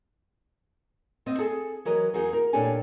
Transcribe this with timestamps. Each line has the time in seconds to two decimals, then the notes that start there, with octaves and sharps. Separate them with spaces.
1.26 B3 C4 D#5
1.39 G#4 A4
1.85 E3 F#3 A#4 D#5
2.14 E2 D#4 F#4 G#4 A#4
2.33 A#4
2.53 A#2 C#4 D4 G4 A4 G#5